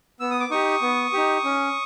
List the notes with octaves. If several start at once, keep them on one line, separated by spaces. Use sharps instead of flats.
B3 E6
D#6
D6
D#4 G4 C#6 D#6
B3
D#4 G4
C#4